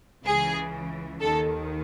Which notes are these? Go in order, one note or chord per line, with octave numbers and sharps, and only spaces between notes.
C#2 C#3 E3 G#4
D#2 D#3 A4